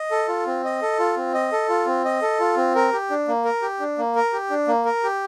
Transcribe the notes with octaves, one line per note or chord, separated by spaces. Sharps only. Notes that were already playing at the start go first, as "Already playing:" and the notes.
Already playing: D#5
A4
F4
C4
D#5
A4
F4
C4
D#5
A4
F4
C4
D#5
A4
F4
C4
A#4
G4
D4
A#3
A#4
G4
D4
A#3
A#4
G4
D4
A#3
A#4
G4